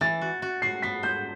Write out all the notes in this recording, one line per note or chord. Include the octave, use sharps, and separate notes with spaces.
E3 A6
F#4
F#4
F#4 C7
B3 B6
C5 G6